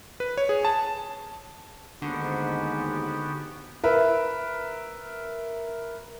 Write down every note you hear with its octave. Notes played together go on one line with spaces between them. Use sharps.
B4
C#5
G#4
A5
D#2 G#2 D3 B3 F#4 G4
A#4 B4 E5